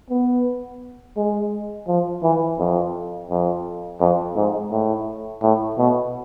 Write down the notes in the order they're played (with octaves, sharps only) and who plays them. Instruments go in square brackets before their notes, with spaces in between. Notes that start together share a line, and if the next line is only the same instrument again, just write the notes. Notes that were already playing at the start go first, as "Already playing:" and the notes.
[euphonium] B3
G#3
F3
E3
F2
F2
F2
G#2
A2
A2
B2